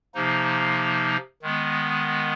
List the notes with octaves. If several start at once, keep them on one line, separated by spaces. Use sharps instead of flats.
C3 F3 A#3 D#4
D#3 G#3 B3